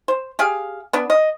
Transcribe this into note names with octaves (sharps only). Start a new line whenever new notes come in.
C5
G4 G#4 F5
B3 D4
D#5